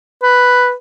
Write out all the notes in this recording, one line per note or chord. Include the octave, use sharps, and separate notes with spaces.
B4